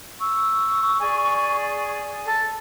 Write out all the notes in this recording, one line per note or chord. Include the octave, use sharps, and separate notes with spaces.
C#6 E6
G#4 D5 G#5
A4